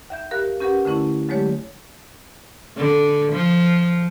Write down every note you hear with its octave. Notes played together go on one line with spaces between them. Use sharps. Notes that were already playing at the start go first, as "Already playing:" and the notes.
D#2 E5 G6
G4 A#4 F5 F#6
C#4 G4 A#4 B4 F#5
D3 A3 C#4 E4
D3 F#3 G#3 A3 G4 C#5
D3
F3